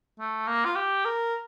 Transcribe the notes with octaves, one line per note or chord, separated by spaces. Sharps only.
A3
A#3
F4
G4
A#4